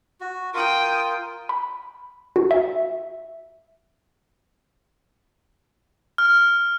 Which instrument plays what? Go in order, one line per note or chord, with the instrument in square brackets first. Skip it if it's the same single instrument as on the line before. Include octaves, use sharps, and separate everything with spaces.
[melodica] F#4
[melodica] F4 A#4 [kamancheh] G5 D#6
[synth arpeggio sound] B5
F#4
E5
[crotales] F6